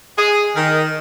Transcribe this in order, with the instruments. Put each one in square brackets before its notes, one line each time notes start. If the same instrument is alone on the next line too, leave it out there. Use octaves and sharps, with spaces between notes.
[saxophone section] G#4
D#3